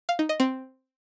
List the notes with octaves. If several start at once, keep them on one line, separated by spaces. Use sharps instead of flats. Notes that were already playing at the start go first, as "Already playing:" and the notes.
F5
D#4
D#5
C4